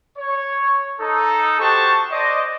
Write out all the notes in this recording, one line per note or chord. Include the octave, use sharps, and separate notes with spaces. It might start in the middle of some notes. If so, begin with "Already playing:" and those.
C#5
D#4 A4
F#4 G4 C5 A5 C#6
C5 D5 D#5